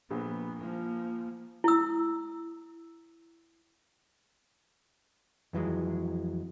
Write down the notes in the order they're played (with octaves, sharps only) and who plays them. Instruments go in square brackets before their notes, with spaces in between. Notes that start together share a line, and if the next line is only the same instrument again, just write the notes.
[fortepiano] A#1 [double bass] B3
[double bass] F3 A#3
[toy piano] E4 E6
[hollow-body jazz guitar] F2 E3 F#3 G#3